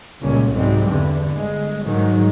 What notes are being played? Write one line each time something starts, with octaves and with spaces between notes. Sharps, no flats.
C#2 A#2 G3 C#4
C2 G#2 F#3 G3 C4
E2 G2 D3
G1 G#3
G#2 D#3 F#3 G#3